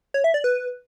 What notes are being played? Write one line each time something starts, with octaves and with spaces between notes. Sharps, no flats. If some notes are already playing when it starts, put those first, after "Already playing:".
C#5
E5
D5
B4